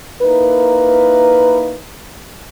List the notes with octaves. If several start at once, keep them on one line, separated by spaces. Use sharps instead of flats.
A#3 D#4 E4 A#4 B4